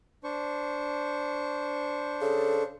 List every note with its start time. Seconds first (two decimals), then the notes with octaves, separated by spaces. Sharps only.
0.24 D4 C5 C#6
2.21 C#3 A4